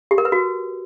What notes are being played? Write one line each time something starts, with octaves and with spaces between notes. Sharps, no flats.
G4
A#4
B4
F#4